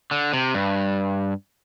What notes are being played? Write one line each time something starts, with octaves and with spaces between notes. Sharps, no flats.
D3
C3
G2